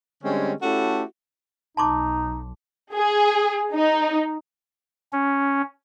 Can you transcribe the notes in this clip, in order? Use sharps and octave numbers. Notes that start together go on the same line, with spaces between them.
D3 G3 G#3 C4 C#4
A3 C#4 E4 F#4 G4 A4
B1 D#4 A5 C6 D6
G#4
D#4
C#4